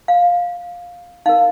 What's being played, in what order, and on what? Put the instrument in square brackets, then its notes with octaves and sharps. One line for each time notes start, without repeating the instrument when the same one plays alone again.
[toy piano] F5
D#4 A#4 F5